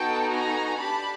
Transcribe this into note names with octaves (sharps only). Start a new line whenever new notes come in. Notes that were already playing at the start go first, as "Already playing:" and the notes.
Already playing: B3 D#4 F#4 A4 G5 A5
G#5 A#5
D4 G4 A5 B5